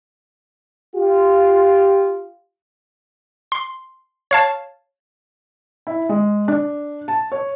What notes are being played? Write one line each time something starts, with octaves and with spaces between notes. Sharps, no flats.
F4 G4
C6
C#5 F5 A5
E4
G#3
D4
A5
C#5